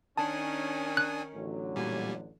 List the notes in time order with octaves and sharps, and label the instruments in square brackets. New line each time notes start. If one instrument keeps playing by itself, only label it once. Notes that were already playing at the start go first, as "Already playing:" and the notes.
[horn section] D#3 C#4 [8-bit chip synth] D4 G#5 D#6 [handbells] A5
[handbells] F#6
[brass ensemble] A1 D3 F#3
[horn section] F#2 G#5 [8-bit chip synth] A#2 G3